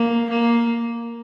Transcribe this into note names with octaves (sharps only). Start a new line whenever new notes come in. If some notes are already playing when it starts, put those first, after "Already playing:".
Already playing: A#3
A#3